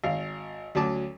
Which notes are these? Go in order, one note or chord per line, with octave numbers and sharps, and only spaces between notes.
G#1 F5
D2 F#3 C#4 A5 D6